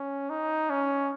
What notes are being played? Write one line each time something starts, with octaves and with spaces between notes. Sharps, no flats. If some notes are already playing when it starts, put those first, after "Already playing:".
Already playing: C#4
D#4
C#4